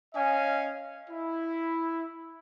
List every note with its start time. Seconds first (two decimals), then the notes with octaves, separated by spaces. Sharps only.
0.14 C#4 D#5 F5 G#5
1.10 E4